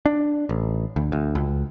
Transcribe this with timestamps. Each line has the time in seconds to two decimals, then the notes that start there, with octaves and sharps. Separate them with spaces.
0.06 D4
0.49 A1
0.96 D2
1.12 D2
1.35 C#2